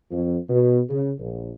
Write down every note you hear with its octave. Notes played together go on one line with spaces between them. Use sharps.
F2
B2
C#3
A#1